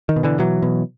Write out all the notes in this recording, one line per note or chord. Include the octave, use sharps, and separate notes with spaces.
D#3
B2
D3 E3
B2 E3 F#3
B2